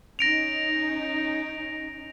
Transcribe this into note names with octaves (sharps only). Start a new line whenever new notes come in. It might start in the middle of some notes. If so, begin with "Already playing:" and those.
C#4 D#4 A#6 D7 F7